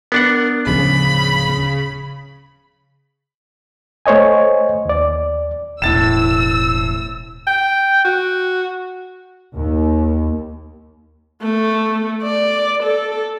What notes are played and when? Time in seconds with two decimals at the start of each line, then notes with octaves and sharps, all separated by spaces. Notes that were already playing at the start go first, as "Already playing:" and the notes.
0.12 B3 D4 A#4 F#5
0.67 D1 C#3 F3 C#4 B5
4.06 A3 C5 C#5 D#5 G#5
4.85 D#2 D5
5.82 E1 A2 E6 A6 E7
7.47 G5
8.04 F#4
9.54 D#2
11.43 A3
12.23 D5
12.83 A4